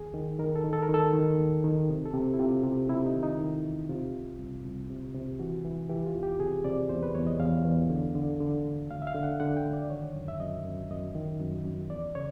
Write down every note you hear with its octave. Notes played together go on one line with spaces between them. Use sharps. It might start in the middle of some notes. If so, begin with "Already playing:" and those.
Already playing: D#2 G#4
D#3
D#3 A#4
A4
D#3
A4
A#4
D#3 A4
D#3
D#2
D#3
C3
A4
C3
E4
C3 F4
C3
C3 E4
D#4
D#3
D#4
D#3
E2
C3 F4
C2
C2
C2
C3
C3
E3 F#4
E3
E3 G4
F4
E2
G4
C3 G#4
C3 D5
E2 C5
B4
E2 C#5
D#5
E2 F5
E2
D3
D3
D3
D2
D2 F5
E5
F5
D3
F#5
D3 F#5
G5
D2
D5
D#3 C#5
F#2
E5
F#2 D#5
F#2
F#2 D#5
D#3
F#2
F#2
E2 D5
C#3 C#5